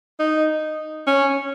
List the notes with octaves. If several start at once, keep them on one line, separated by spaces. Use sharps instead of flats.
D#4
C#4